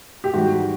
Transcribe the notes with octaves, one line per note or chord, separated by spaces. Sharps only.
G4
G#2 E3 G3 F#4